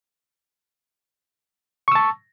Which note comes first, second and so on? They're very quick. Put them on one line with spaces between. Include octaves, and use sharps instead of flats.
C#6 E6 A5